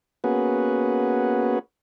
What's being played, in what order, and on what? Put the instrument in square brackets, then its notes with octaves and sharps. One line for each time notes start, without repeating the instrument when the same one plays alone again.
[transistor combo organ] A#3 B3 C#4 F#4 G#4 B4